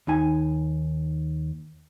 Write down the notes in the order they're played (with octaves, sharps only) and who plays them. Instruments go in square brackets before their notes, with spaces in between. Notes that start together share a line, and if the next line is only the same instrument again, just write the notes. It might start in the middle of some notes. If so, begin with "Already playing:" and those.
[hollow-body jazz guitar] D#2 D#4 G#5